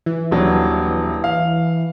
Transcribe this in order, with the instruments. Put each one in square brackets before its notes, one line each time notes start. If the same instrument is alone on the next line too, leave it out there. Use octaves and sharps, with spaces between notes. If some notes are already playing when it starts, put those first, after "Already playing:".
[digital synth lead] E3
[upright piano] D#1 F#3 D4
F5